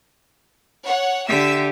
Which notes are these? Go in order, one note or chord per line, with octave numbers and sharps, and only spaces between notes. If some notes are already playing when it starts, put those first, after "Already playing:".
C#5 F#5
D3 G4 E5 E6 B6